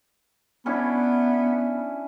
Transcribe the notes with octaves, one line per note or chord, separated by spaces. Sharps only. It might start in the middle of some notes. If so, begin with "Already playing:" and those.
B3 C#4 D4 E4